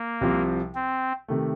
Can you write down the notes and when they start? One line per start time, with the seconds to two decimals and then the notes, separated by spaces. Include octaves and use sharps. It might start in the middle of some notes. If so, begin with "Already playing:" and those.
Already playing: A#3
0.21 C2 C3 F3 C4
0.75 C4
1.28 C3 D#3 A3